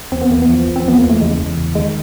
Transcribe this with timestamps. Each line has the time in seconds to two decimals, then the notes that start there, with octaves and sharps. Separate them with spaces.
0.11 E2 C4
0.22 B3
0.30 E2 A#3
0.42 B3
0.48 F3
0.67 E2
0.76 C4
0.85 F3 B3
0.99 E2 A#3
1.10 A3
1.21 C#3 G#3
1.39 E2
1.57 C#3
1.75 D#3 G#3